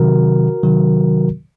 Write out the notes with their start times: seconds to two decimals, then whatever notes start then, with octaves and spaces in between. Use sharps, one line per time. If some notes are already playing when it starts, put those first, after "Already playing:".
Already playing: C3 D#3 F#3 F#4 A#4
0.63 C3 D#3 F#3